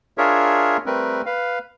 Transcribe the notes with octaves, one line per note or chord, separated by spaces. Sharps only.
D4 F4 G#4 A#4 C#5 E5
G3 A3 C4 A#4 B4
B4 F5